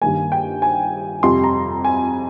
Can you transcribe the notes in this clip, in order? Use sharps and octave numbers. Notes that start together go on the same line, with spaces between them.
G2 D#3 A#3 G#5
G5
G#5
F2 C3 G3 C6
A#5
G#5